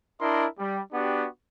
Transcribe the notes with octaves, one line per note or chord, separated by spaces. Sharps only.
D4 E4 A#4 D#5 C6
G3
B3 D4 F#4 G4